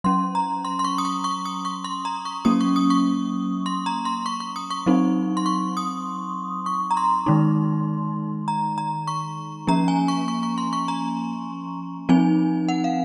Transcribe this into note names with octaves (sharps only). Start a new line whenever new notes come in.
F#3 C#4 C6
A#5
C6
C6
C#6
D#6
C#6
C#6
D#6
C#6
C6
A#5
C#6
F#3 A#3 C#4 D#6
C#6
D#6
C#6
C6
A#5
C6
C#6
C#6
D#6
C#6
F#3 C4 D#4
C6
C#6
D#6
C#6
A#5
C6
D#3 G#3 D#4
A#5
A#5
C#6
F3 A#3 C#4 A#5
G#5
C#6
C#6
C#6
C6
C#6
A#5
F3 C4 D#4 G#5
F#5
F5